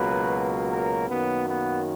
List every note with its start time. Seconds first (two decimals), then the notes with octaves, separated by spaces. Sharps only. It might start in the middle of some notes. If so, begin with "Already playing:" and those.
Already playing: C#2 B2 F#3 A#3 B4
0.71 A#4
1.09 F#2 D#3 F#3 A#3 B3
1.47 B3